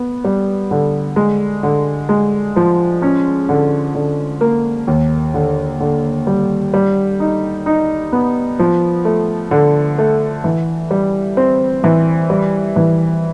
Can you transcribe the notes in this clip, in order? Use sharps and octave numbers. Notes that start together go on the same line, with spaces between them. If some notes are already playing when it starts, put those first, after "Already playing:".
Already playing: B3
G3
D3
G#3
D3
G#3
F3
C#4
D3
D3
A#3
D#2
D3
D3
G3
G3
D#4
D#4
B3
F3
A3
D3
A3
E3
G3
C4
E3
G3
E3